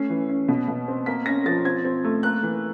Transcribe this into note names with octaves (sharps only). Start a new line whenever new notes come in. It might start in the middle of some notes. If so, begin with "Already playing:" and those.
Already playing: A3 C#4 C7
E3
C#4
B2
B2
C4
A#3 B6
C#4 A#6
F3 A6
C4 G#6
C4
A3
A#3 F#6
E3